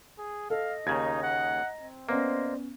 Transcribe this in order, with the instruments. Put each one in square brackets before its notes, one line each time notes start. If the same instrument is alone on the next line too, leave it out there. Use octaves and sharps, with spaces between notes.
[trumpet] G#4
[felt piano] A4 [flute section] D#5 [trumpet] F5
[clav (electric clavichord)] D#2 C#3 [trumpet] D#4 [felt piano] A#5 G#6
[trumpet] F#5
C4
[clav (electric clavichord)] A#3 [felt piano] B3 C#4 [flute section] C5 D5 D#5